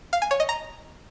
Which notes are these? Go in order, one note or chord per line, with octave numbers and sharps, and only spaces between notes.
F5
G#5
C#5
D#5
A#5